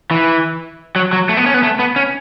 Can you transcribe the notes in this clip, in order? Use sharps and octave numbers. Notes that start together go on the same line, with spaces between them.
E3
F#3
F#3
A3
B3
C#4
B3
A3
B3
C#4